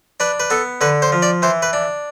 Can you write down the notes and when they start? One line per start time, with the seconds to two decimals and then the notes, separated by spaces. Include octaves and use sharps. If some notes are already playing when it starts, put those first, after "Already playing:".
0.20 D4 B4
0.40 B4
0.50 B3 A4
0.81 D3 B4
1.02 C5
1.12 F3
1.22 D5
1.42 E3 C5
1.62 B4
1.73 D4